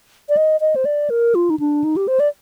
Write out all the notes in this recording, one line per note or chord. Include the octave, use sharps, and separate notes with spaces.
D5
D#5
D#5
C5
D5
A#4
F4
D#4
D4
D#4
G4
C5
D5